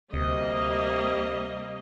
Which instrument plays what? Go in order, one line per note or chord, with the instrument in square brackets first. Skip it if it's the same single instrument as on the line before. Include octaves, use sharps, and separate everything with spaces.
[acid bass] D2 [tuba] C3 [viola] G3 A#3 [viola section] D#5